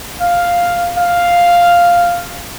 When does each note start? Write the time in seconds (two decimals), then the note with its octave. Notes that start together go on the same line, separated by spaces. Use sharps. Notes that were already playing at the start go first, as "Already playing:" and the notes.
0.21 F5
0.98 F5